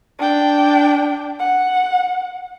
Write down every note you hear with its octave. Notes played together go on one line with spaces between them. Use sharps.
D4 G5
F#5